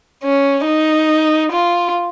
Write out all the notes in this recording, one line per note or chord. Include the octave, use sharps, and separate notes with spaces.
C#4
D#4
F4